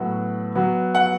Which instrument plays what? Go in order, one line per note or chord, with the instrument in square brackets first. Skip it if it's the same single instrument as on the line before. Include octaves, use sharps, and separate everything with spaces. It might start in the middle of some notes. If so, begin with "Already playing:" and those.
Already playing: [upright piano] A2 F#3 B3 F#4
F#3 B3 F#4
[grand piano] F#5